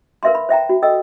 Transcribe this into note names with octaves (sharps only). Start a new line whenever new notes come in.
A#4 B4 E5 F5 C6
B5
C5 E5 G5 A#5
F#4
A4 D#5 G5 E6